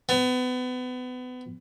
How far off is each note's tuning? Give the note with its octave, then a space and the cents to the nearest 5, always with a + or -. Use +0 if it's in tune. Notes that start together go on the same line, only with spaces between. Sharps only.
B3 +30